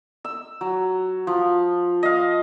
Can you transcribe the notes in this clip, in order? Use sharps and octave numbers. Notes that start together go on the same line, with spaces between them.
E6
F#3
F3
D#5 F5